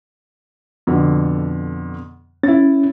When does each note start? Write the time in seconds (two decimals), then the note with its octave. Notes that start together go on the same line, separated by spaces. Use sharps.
0.87 F2 B2 D3
2.43 C#4 E4 A6